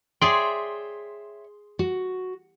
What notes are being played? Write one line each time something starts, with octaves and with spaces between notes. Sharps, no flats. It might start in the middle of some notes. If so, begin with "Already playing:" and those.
G#4 C#5 D5 E5 G5 C6
F#4